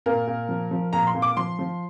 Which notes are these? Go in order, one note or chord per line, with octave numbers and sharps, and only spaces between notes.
A#2 A#4
A#2
F3
F3
A#2 A#5
C6
A#2
D6
F3 C6
F3